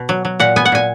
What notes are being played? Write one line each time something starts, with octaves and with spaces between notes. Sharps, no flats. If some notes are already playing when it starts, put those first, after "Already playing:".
Already playing: B2
F#3
F#3
A#2 F#5
B3 G#5
F#5
A#2 G#5